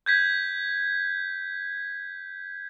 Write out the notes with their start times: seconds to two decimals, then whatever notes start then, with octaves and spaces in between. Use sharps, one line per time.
0.06 G6 G#6 B6